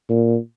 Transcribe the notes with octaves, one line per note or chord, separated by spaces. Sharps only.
A#2